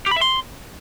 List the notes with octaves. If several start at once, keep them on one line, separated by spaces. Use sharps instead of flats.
G4
B5
E5
C6